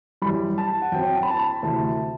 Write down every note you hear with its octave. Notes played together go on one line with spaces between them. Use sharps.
F#2 E3 G3 B5
A5
F#5
F#2 F#3 C4 G5
A5
B5
A5
B5
D2 C3 E3 A3 A5